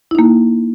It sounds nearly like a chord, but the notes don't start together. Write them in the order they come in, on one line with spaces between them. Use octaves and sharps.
E4 D#4 A#3